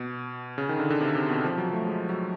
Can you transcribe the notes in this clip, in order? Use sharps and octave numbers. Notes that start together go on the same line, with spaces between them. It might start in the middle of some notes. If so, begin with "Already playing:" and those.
Already playing: B2
C#3
D#3
D3
D3
C3
C3
B2
F3
F#3
A3
G#3
F#3